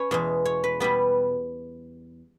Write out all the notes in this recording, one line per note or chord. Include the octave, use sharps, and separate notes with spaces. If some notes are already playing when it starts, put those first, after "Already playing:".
Already playing: C#4 B4 C#5
E2 B2 G#3
C#5
B4
B2 G3 B3 B4